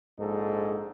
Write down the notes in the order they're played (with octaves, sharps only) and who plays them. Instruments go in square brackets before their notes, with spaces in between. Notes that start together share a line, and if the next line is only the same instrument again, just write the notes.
[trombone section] A#1 G#2 D#4 A4